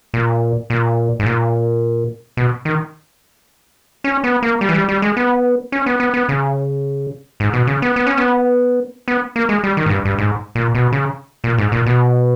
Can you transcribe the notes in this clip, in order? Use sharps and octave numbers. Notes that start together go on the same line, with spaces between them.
A#2
A#2
G#2
A#2
B2
D#3
C#4
B3
A#3
G3
E3
G3
G3
G#3
B3
C#4
B3
B3
B3
C#3
G#2
B2
C#3
B3
B3
C#4
B3
B3
A#3
G#3
G3
D#3
G#2
G2
G2
G#2
A#2
B2
C#3
A#2
G#2
A#2
B2